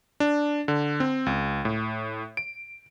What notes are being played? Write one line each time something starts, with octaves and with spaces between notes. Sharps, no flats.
D4
D3
C4
C#2
A2
D7